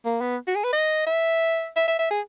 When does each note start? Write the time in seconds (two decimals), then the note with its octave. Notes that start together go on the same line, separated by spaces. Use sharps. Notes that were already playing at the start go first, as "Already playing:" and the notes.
0.05 A#3
0.21 B3
0.47 F#4
0.55 G#4
0.64 B4
0.73 D#5
1.07 E5
1.76 E5
1.88 E5
1.99 E5
2.10 G#4